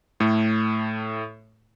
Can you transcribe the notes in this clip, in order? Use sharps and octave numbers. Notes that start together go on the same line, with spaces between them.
A2 A3